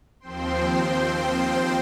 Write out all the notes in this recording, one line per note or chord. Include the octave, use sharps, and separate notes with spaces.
D#2 F3 C4 C5 G5 C6